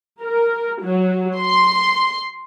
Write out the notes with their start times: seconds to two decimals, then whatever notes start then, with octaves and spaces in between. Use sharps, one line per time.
0.22 A#4
0.82 F#3
1.40 C6